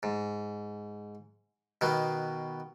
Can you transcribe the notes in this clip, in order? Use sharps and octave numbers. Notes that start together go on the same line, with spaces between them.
G#2
B2 D#3 B3